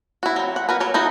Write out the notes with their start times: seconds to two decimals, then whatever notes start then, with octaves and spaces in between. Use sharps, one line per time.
0.23 E4 F#4
0.36 F#3 C4
0.56 F#5
0.69 F#4 A#4 B4
0.80 F#3 C#5
0.94 D#4 E4 F#4